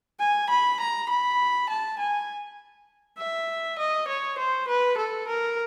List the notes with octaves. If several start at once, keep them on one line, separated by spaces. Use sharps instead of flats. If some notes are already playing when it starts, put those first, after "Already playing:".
G#5
B5
A#5
B5
A5
G#5
E5
D#5
C#5
C5
B4
A4
A#4